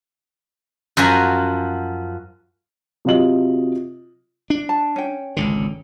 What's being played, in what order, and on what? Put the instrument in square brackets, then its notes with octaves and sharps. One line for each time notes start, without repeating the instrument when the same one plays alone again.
[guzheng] F#2 F3 F#4 G#5
[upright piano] C3 F#3 F4 D#5 F#7
[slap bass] D4
[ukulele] A5
C#4 G5
[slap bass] G#1 C#2 D3